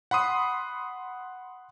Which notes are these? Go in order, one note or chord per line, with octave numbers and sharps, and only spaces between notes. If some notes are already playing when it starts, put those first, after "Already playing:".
F#5 B5 C6 D#6